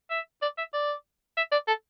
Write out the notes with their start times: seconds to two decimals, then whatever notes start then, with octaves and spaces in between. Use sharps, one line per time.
0.10 E5
0.42 D5
0.58 E5
0.74 D5
1.37 E5
1.52 D5
1.68 A4